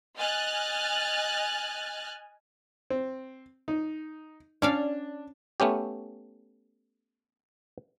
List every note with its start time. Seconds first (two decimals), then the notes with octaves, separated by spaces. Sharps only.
0.17 D#5 G#5 F6 F#6 A6
2.90 C4
3.68 D#4
4.62 C#4 D4 D5 F5
5.60 A3 B3 C#4 G4